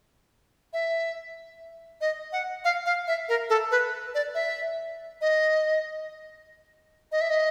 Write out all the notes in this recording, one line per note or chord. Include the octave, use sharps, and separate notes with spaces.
E5
D#5
F#5
F5
F5
E5
A#4
A4
B4
D5
E5
D#5
D#5
E5
D#5